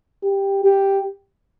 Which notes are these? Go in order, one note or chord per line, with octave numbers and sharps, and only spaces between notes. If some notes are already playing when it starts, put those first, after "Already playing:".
G4
G4